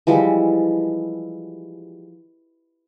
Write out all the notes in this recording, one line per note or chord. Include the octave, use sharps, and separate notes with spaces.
E3 F3 G3 G#3